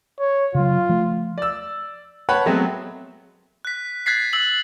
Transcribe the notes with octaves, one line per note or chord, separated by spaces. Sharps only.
C#5
C#3 F#3 F4
F3 A3
D5 E6
B4 C#5 F#5 G5 A5 B5
F#3 G#3 A3 B3 C4 D#5
F#6 B6
F#6 G#6 A6 B6 C7
E6 F#7